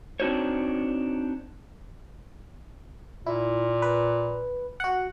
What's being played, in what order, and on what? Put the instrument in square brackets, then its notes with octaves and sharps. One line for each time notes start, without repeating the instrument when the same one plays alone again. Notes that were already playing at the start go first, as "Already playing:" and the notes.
[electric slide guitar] C4 D4 D#4 F#4 C5 C#5
[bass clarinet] A#2 [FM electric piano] E4
[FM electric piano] B4
F#4 F#5